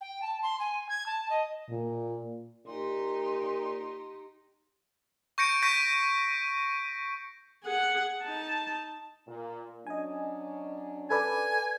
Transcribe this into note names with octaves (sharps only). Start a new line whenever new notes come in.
G5
A5
C6
G#5
G#6
A5
D#5
A#2
A#2 D#4 G4 C6
C#6 G6 A#6 C#7 D7
C#6 G6 A#6 B6 D#7
G#4 F#5
D#4 A5
A#2
F#3 C#4 D4 D#5 G#5
A4 B4 D5 G#5